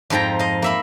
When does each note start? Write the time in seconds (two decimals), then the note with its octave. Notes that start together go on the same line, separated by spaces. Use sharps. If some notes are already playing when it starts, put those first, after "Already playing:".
0.10 F2 G#2 F3 G5 A#5
0.39 D#5 F5
0.62 A#3 E5 B5